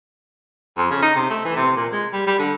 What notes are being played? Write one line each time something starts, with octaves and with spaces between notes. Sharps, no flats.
F2
C#3
D#4
C3
A3
E3
C3
A#2
G#3
G3
G3
D3